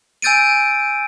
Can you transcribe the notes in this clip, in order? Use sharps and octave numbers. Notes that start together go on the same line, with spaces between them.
G#5 E6 G6 A6 D7 D#7